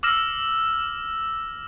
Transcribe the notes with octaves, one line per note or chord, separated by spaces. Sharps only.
D6 E6 F6 A#6 E7